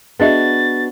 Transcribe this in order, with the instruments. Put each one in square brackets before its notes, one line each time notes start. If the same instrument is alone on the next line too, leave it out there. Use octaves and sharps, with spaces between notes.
[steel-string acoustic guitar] B3 D4 F#4 [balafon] G#4 D#5 E5 [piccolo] A6